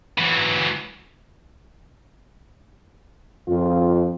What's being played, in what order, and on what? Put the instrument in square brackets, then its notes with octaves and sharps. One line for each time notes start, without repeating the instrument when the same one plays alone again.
[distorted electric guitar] E3 F#3
[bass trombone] F2 [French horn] F4